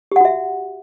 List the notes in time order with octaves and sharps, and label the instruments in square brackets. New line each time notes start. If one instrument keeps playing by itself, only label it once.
[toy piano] G4
F#5
F#4
E5